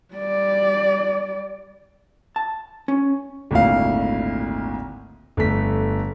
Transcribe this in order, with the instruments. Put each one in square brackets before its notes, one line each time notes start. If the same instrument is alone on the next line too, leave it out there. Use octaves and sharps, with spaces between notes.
[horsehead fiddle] G3 D5
[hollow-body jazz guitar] A5
C#4
[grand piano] G#1 D2 A#2 E4 F5
G1 A3 B6